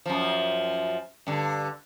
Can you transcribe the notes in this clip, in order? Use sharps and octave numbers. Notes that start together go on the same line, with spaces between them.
F#2 F3
G2 D3